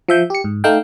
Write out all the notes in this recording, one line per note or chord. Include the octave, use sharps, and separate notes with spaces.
F3 E5 G6
G4 C#7
G#2
A3 D#4 F5 G5